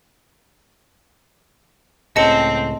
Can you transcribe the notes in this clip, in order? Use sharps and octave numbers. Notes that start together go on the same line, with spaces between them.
C#2 A2 C#3 C4 D#5 A5 C#7